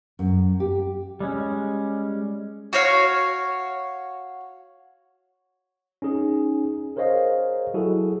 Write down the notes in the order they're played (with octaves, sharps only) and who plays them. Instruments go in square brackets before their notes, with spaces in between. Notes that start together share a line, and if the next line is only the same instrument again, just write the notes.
[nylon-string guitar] F#2
G4
[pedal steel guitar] G3 G#3 C#4
[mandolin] F#4 C#5 F5
[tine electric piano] C#4 D#4 G#4
G#4 A#4 C5 C#5 D#5 F5
F#3 E4 F#4 G#4 A4